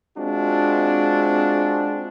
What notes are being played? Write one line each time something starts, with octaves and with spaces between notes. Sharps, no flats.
G#3 C4 D4 F4 F#4